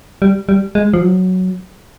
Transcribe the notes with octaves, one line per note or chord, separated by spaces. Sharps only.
G3
G3
G#3
F3
F#3